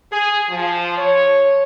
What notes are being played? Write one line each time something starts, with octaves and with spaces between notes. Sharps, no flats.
G#4
F3
C#5